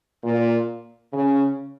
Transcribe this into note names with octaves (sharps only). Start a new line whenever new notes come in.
A#2
C#3